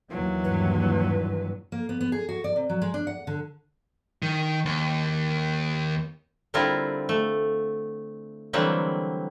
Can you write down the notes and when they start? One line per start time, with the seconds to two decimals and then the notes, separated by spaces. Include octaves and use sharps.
0.11 D#2 E3 F#3 A#3
0.44 G2 A#2 B4
1.72 A#3
1.89 B3
2.01 B3
2.12 G#4
2.29 F#4
2.44 D5
2.56 C3
2.69 F#3
2.82 G#3
2.94 D4
3.07 F#5
3.27 D3
4.22 D#3
4.65 D#2
6.54 D3 G3 C4 E4 F4 A#4
7.09 A3
8.53 D3 E3 F#3 G3 A#3 C4